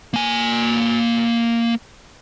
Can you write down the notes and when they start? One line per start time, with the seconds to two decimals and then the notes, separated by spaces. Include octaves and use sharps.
0.14 A#3 G#5